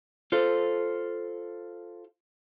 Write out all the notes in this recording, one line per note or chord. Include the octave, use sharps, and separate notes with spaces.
F4 A4 C5